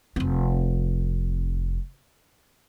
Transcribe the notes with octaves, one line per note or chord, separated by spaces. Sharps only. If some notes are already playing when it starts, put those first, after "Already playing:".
F1 C4